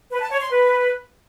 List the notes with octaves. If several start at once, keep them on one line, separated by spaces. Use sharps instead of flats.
B4
A5
C#5
C6
B4